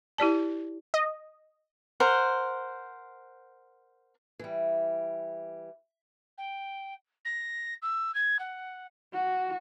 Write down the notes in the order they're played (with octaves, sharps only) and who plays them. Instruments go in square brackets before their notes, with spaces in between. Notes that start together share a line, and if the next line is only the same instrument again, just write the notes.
[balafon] E4 G4 D5 A5
[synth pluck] D#5
[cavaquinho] A#4 C5 F#5
[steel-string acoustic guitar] E3 G3
[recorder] G5
A#6
E6
G#6
F#5
[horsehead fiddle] F#4